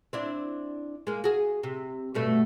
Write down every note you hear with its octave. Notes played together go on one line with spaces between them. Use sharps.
C4 D4 E4
G#3 A#3
F#4 G#4
C3
G2 B2 A3